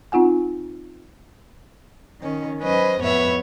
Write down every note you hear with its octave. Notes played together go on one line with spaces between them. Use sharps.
C4 D#4 F4 F#5 G#5
D#3 C#4
F#3 C#4 B4 C5 D#5
F2 A2 B3 B4 C#5 E5